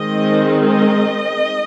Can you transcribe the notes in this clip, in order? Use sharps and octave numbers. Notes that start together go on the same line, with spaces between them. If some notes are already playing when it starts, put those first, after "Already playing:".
Already playing: D#3 G#3 C4 D#5
D#5